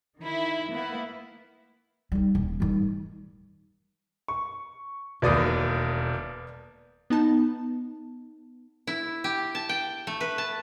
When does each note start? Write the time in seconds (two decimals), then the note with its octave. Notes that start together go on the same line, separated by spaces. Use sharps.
0.19 D#3 E4
0.71 A#3 B3 E4
2.12 G3 D#4
2.35 D#1
2.60 D#3 G3
4.28 C#6
5.22 E1 D#2 B4 D5 D#6
7.10 B3 D#4 A5
8.87 E4
9.24 G4
9.55 A5
9.69 G5
10.07 A3
10.21 B4
10.38 A5